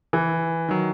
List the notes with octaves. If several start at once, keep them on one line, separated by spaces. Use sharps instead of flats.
E3
D#3 F#3